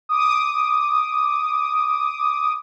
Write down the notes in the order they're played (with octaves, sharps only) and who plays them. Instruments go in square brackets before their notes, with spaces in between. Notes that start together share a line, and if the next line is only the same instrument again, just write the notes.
[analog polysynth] D6 D#6